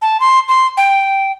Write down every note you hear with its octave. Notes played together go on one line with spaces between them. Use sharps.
A5
C6
C6
G5